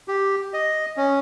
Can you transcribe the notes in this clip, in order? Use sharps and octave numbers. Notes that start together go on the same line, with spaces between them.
G4
D#5
C#4